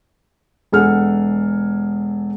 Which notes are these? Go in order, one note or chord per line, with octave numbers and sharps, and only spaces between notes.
E1 G#4 A4 F#5 F6